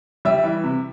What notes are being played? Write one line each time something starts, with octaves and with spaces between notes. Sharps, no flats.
G3 E5
E3
C3